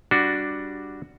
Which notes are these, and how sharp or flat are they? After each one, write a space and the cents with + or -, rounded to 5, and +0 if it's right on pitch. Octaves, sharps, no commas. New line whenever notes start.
G3 +0 D4 +0 F#4 +0